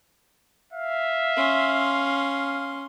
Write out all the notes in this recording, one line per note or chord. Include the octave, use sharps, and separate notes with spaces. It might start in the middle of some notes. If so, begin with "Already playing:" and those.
E5 F5
C#4 C6